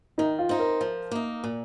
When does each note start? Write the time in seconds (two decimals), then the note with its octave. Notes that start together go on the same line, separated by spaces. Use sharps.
0.18 D#3 D#4
0.39 F4
0.49 C4 D#4
0.59 A#4
0.81 F3
1.11 A#3 D#4
1.44 A#2